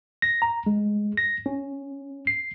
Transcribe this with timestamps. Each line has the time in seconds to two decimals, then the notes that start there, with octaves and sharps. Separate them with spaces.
0.22 A#6
0.42 A#5
0.66 G#3
1.17 A#6
1.46 C#4
2.27 C7